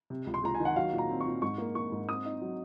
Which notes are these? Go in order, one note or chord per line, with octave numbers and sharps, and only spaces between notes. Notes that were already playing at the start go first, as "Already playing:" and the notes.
C3
C#2
C6
C#2 A#5
G#5
D#3
F#5
F#3 F5
A#2
A#5
C4
C#6
A#2
G#2 C#6
A#3
A#3 C#6
G#2
C4 D#6
D#4
F#3